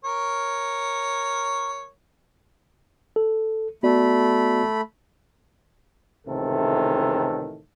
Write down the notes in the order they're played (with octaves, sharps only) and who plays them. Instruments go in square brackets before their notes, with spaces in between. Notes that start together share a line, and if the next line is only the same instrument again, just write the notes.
[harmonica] A#4 C#5
[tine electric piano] A4
[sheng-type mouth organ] A3 B5 [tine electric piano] B3 F#4 D5
[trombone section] C#2 A2 C3 D#3 E3 A4